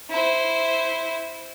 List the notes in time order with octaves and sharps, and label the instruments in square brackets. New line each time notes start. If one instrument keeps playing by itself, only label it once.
[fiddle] E4 C5